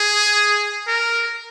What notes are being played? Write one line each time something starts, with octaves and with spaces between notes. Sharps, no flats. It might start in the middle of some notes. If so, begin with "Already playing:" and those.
Already playing: G#4
A#4